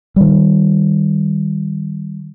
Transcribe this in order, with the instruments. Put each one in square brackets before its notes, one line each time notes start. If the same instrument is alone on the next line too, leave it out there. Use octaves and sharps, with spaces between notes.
[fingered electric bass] D#3 G3